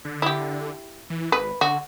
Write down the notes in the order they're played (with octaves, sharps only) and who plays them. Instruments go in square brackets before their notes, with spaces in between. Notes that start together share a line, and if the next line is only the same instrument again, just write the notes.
[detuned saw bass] D3
[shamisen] E4 G4
[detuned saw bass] E3
[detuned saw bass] G#1 [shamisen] B4
[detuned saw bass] D3 [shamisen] F#4